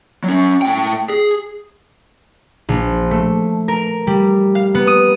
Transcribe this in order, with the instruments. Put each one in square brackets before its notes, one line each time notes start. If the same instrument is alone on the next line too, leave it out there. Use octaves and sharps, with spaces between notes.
[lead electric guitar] F#3 C#4
A2 G5
G#4
[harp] A#1
A3
A#4
G3
F5
B3
D#6